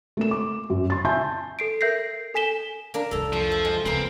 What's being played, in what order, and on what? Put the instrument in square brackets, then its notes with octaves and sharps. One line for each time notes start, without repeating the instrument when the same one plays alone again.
[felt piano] A3 A#3 E7
D6
F#2
C6 A6
E5 G#5 A5 C6 G6
[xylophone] A4 C7 D7
A#4 E5 G6 A#6 C7
A4 G#5 B6 E7 G7
[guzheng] A#3 D4 A#4
[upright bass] C2 F2 [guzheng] A4 A#5
[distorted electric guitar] F3 [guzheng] A3
[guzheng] E5
G#3
[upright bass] D2 C#3 [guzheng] F3 A#4 B4 [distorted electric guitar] C4